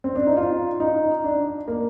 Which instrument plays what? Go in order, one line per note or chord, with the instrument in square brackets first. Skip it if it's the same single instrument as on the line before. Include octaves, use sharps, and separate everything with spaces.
[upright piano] C4
D4
D#4
F4
D#4
D4
A#3